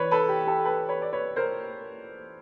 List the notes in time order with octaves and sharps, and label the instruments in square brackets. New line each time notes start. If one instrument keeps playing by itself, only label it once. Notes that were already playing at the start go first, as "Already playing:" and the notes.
Already playing: [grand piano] E3 B4 C#5 D5
A4 B4
G4
G4 A4
A4 B4
B4 C#5
D5
B4 C#5
A#4 C5